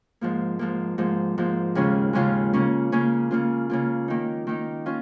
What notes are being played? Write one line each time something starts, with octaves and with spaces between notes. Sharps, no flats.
G#2 F3 A#3
G#2 F3 A#3
G#2 F3 A#3
G#2 F3 A#3
D#2 C#3 G#3 C#4 F4
D#2 C#3 G#3 C#4 F4
C#3 A#3 C#4
C#3 A#3 C#4
C#3 A#3 F4
C#3 A#3 F4
D#3 A#3 D#4
D#3 A#3 D#4
C#4 F4